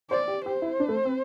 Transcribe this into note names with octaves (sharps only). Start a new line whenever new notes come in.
C5 D5
G4
G4 C5
E4
D4
A3
C4